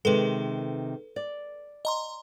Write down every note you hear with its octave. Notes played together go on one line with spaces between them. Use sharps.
C3 D#3 G#3 A4 B4
D5
D#5 A#5 C6